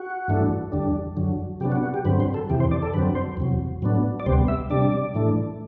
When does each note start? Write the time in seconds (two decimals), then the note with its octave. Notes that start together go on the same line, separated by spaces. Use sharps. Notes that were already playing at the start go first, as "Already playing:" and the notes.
Already playing: F#4
0.28 G2 E3 A3 D4
0.72 E2 D3 G3 D4
1.17 F#2 D3 F#3
1.60 C3 F#3 B3 D4 G4
1.72 F#4
1.83 F#4
1.94 G4
2.05 G2 D3 F#3 C4 B4
2.20 C5
2.34 A4
2.49 E2 C3 E3 G4
2.60 C5
2.71 D5
2.82 A4
2.94 F#2 D3 F#3 C4 B4
3.15 C5
3.37 E2 C3 F#3
3.82 A2 F#3 B3 D4
4.20 D5
4.26 D2 C3 G3 B3 C5
4.48 E5
4.70 C3 G3 D4 D5
5.14 A2 E3 A3 D4